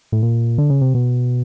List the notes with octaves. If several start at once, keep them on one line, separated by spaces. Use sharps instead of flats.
A2
A#2
D3
C#3
C3
B2